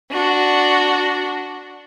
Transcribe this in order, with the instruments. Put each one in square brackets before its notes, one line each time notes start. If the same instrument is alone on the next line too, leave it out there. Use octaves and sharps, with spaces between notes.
[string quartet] D4 F#4